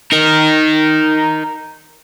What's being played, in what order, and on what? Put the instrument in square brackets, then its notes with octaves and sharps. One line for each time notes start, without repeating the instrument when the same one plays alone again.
[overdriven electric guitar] D#4 A#4